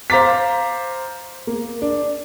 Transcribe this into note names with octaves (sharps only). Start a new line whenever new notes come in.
C5 F5 A#5 D6 A6 B6
A#3
D4